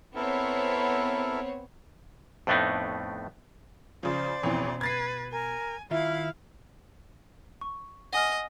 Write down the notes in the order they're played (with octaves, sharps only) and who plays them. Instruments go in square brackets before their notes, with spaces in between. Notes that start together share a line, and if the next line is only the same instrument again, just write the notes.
[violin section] B3 C4 C#5 [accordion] E4 A4 A#4
[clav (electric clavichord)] F2 A2 A3 B3 D4 D#4
[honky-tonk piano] C#3 F3 [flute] C5 [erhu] D5
[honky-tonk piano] A1 F2 E3 [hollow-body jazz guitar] B2
[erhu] B4 [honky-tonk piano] G#6 A6 C7
[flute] A#4 [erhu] G#5
[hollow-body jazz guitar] D#3 F4 E5 [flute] E4 [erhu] F5
[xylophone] C#6
[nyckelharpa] D#5 [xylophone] F#5 G#5 F6